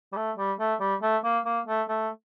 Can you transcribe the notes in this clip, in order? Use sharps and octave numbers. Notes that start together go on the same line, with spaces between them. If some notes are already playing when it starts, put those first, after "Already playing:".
G3
A3
G3
A3
G3
A3
A#3
A#3
A3
A3